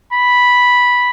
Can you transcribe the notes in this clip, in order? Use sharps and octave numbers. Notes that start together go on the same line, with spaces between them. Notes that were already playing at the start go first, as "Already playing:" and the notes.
B5